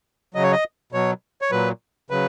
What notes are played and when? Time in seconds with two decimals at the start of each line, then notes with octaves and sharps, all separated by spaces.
0.34 C#3 F#3 D#5
0.43 C#5
0.52 D#5
0.92 B2 F#3 C#5
1.42 C#5
1.51 A#2 F#3 B4
2.10 C#3 F#3 B4